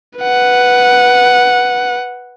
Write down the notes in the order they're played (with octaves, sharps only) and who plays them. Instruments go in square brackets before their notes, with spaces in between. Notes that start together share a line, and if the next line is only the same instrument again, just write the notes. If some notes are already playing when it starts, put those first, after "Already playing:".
[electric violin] B4 F#5